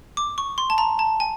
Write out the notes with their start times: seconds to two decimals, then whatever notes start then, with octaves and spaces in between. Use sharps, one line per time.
0.17 D6
0.38 C#6
0.58 C6
0.70 A5
0.78 A#5
0.99 A5
1.20 G#5